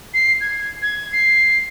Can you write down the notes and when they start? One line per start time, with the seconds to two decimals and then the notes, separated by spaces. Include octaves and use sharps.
0.14 C7
0.41 G#6
0.82 G#6
1.12 C7